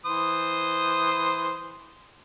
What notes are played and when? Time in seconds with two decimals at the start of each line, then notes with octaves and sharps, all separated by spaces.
0.05 E3 C5 D#6